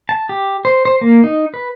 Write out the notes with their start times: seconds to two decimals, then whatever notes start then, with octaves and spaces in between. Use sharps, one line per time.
0.09 A5
0.29 G4
0.65 C5
0.85 C5
1.01 A#3
1.24 D#4
1.54 B4